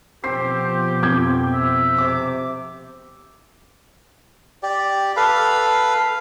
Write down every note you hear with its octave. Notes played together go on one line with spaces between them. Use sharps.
B2 F3 C4 G4 C7
F2 G5 D6 G#6
E5
C3 D6
G4 D5
A4 B4 F5 B5